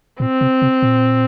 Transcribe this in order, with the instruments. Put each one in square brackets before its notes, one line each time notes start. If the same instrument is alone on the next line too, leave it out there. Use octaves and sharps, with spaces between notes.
[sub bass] A#2 [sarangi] C4
[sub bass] C3
C3
A#2